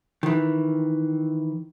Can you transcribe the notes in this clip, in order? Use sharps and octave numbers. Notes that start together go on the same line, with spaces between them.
D#3 E3